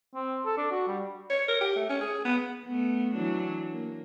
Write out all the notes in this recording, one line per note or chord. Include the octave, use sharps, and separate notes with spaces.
C4
A4
D4
F#4
G3
C#5
A#4
G4
A3
C#4
G#4
B3
A3 B3
E3 F#3 D4
A#3